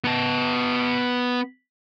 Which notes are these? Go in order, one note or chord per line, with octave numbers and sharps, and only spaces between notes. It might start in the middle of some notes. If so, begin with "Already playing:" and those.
B3 A5